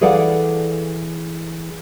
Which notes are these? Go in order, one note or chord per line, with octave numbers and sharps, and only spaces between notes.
E3 G#4 A4 D5 F5 F#5